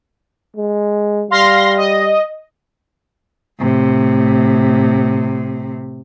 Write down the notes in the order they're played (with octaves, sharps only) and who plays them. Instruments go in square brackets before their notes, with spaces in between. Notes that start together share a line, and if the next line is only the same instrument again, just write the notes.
[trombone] G#3
[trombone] G3 [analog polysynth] F5 C6 A#6
[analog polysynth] D#5
[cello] A2 C3